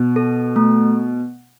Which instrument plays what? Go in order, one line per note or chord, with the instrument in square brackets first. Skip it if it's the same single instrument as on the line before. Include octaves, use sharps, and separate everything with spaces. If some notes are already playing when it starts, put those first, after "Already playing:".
Already playing: [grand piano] B2
[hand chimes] A4
A3